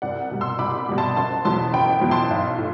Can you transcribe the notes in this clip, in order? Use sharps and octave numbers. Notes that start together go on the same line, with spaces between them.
C2 D5 F#5
B2 G3
C6 E6
C2 B5 D6
B5 D6
B2 G3
A5 C6
F#1 A5 C6
E2 B2 F#3 A5 C6
F#1 G5 B5
E2 B2 F#3
A5 C6
B1
A2